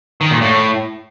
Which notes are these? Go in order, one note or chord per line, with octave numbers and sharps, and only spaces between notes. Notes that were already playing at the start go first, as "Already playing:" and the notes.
D#3
A#2
A2